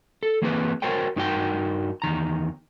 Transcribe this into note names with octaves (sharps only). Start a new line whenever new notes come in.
A4
E3 A#3 C4 G#4 A4 B4
F#4 A#4 C5 C#5 G5
G2 D#4 F#4 A#4 G5
E2 D#3 A#5